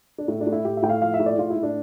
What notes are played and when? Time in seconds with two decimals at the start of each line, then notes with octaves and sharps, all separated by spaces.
0.18 D4
0.28 A2 E4
0.41 D4
0.47 A2
0.52 E4
0.65 A2 G4
0.77 E5
0.83 A2 G5
0.89 F5
1.01 F3 F5
1.14 E5
1.20 A2
1.26 D5
1.38 A2 F4
1.50 E4
1.56 A2
1.63 D4